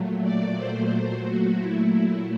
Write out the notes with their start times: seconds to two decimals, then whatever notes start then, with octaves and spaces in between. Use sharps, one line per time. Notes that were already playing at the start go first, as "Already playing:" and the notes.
Already playing: A#2 F#3 A3
0.23 D5
0.57 C5
1.24 A#2 F#3 A3 F#4
1.58 E4